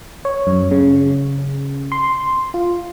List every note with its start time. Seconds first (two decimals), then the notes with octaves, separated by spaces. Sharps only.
0.25 C#5
0.47 F#2
0.71 C#3
1.92 C6
2.54 F4